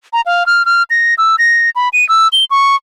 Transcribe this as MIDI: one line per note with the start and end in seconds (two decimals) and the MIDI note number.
0.13 0.21 82
0.26 0.46 77
0.46 0.65 89
0.66 0.83 89
0.90 1.14 94
1.18 1.36 88
1.39 1.70 94
1.76 1.89 83
1.93 2.07 99
2.09 2.28 88
2.33 2.44 103
2.51 2.76 85